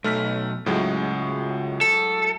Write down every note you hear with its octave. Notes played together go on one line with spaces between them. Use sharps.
B1 A3 F6 B6
C#2 A2 F#3 G#3
A4